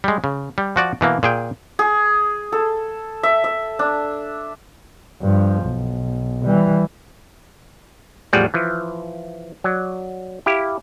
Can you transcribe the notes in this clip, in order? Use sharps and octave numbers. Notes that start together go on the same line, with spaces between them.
G3 G#3
C#3
G3
F3 F#4 D5
B2 E3 A#3
A#2 G#4 G5
G#4
A4
E5
E5
D4
G2 F3
B1
E3 G3
E2 A2 F3 G3 G#4 F#5
E3 F3
F#3 D5
E4 G4 F5